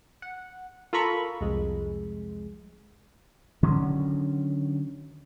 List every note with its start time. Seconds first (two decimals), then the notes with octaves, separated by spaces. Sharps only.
0.22 F#5
0.93 F4 A4 A#4 A#5 B5 C#6
1.41 C2 F2 G#3
3.63 D3 D#3 F#3 C#4